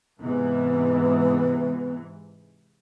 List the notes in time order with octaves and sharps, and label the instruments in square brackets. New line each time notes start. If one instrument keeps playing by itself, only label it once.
[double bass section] G#2 C3 E3 [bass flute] B3